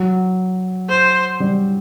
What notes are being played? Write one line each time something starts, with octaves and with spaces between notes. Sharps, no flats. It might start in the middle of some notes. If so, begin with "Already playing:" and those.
Already playing: F#3
C5
G3